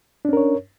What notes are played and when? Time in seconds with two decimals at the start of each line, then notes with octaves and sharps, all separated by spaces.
0.25 D4
0.29 C#4
0.33 A#4
0.37 C#5